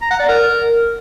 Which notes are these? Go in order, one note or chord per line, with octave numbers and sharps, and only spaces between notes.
A#5
F#5
D5
A#4